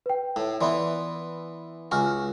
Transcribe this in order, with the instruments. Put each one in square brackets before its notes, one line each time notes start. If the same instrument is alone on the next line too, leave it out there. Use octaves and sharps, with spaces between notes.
[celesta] B4 G5
[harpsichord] A2
[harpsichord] E3 B3 [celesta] D5 E5 C6
[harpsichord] C#2 F#4 [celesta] G#5 C#6 F6